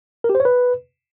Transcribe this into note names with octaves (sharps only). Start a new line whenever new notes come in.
A#4
G4
C5
C#5
B4